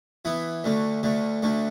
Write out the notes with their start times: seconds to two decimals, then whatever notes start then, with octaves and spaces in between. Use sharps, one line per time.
0.25 E3 B3 E4
0.64 D2 D3 A3
1.03 D2 D3 A3
1.42 D2 D3 A3